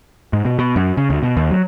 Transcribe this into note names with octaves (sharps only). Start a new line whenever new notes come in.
G#2
B2
B2
F#2
C#3
D2
B2
D#2
F#3